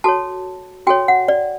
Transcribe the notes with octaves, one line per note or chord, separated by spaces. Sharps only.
F#4 A4 C#5 A5
F#4 A4 C#5 G5
F#5
D5